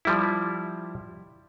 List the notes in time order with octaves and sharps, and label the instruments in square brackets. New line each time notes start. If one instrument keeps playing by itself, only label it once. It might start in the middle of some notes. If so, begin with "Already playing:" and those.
[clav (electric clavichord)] F3 G3 E4